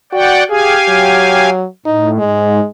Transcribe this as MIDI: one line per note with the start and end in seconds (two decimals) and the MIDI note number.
0.13 0.43 66
0.13 0.44 74
0.13 0.44 78
0.13 0.44 79
0.50 1.50 67
0.50 0.75 68
0.50 1.50 77
0.50 1.50 80
0.88 1.66 54
1.86 2.18 45
1.86 2.10 63
2.19 2.60 44
2.19 2.66 56